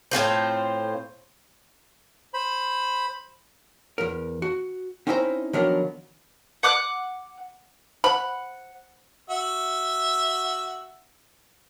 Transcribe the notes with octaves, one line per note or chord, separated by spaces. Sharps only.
A2 C4 F4 C5
C5 B5
E2 A#4
F#4
C4 C#4 D#4 E4 C5 A#5
D#3 F3 F#3 B3 D4 A#4
F#5 D6 F#6
C5 F#5 B5
F#4 E5